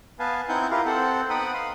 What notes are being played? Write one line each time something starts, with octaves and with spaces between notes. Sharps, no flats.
B3 B4 F5 G#5 A5
C4 D#4 E4 F#5 G#5 G6
E4 F4 G4 A#4 B4 F5
C4 A4 C5 F#5
B3 D#4 F#5 G5 B5 D#6
F5 B5 C6 D#6